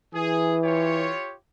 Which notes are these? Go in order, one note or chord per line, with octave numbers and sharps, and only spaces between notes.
E3 G#4
F4 G4 C#5